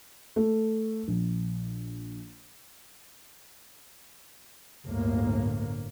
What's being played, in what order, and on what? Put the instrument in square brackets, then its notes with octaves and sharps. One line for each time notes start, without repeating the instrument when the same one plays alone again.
[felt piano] A3
A#1
[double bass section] G1 D2 A2 A#3